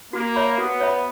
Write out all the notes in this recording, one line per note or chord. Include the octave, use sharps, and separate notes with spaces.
A#3 F#4
C#5 E5 B5
B3 F#4
C#5 E5 B5